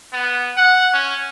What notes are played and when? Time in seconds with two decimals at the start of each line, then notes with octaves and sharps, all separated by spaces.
0.13 B3
0.57 F#5
0.93 C#4